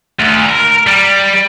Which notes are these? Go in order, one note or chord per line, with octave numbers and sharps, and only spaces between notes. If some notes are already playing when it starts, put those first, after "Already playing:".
D2
A#4 A#5
G3